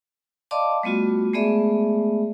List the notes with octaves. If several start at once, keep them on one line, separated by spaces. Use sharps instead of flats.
D5 D#5 F5 A5 C6 D6
G3 A3 B3 F4 F#4
G#3 A3 B3 G#4 D5 E5